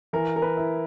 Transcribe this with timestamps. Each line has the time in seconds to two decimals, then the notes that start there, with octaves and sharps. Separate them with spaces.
0.13 E3 A#4
0.36 A#4
0.42 B4
0.57 E4